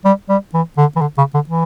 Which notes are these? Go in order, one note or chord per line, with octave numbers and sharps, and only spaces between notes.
G3
G3
E3
D3
E3
D3
C#3
D3
E3